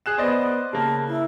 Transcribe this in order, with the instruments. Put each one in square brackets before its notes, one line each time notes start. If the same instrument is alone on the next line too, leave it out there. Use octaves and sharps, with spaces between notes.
[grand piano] G#4 F#6 E7
[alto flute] B3 [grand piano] C5 D5 D#5
[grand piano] C#3 A#3 [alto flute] A5
[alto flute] E4